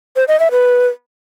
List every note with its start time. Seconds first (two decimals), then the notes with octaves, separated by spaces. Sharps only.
0.16 C5
0.28 D#5
0.40 E5
0.52 B4